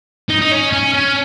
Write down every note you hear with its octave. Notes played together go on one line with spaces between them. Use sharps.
D#4
D#4
C#4
C#4
C#4